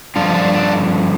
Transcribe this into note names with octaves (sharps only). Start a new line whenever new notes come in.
G2 D3 F3 F4
D4
D4